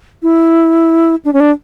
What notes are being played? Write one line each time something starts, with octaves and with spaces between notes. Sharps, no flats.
E4
D4
C#4
D4